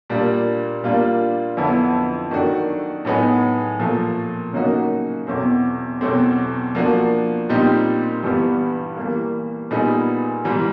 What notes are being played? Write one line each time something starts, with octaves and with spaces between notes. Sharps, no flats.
A#2 G3 A#3 D4
A#2 G3 A#3 D4 F4
F2 D3 F#3 B3 E4
D#3 F#3 A3 D4 F#4
A2 F#3 B3 D#4 G#4
A#2 F3 A3
C#3 F#3 A#3 D#4 F#4
E2 B2 F#3 A3 C4
E2 B2 F#3 A3 C4
F3 A#3 D4 F#4
A#2 G3 C4 D#4 G4
G2 E3 G3 B3
E3 G3 A#3
A#2 G3 B3 D#4 G#4
G#2 E3 G3